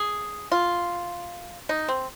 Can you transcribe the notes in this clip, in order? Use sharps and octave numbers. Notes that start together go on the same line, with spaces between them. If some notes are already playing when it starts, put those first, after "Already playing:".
Already playing: G#4
F4
D#4
C4